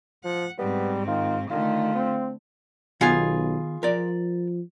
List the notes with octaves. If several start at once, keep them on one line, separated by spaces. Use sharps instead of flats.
F3 F#5
G#2 G3 B3 C4
D#3 F4
D3 D#3 A3 F4
C4
B1 D#3 B3 F4 G#4 G#5
F3 A#4 D5